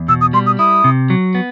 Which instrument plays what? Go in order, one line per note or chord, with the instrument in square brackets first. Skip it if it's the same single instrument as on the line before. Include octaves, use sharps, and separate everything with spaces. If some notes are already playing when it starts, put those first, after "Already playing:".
Already playing: [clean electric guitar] E2
[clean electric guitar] B2 [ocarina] E6
[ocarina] D#6
[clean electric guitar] G3 [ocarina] C6
[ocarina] D#6
[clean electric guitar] E4 [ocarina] D#6
[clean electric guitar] C3
F#3
B3